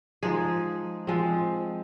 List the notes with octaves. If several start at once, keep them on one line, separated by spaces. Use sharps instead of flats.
F3 G#3 D#4 G#4
F3 G#3 C4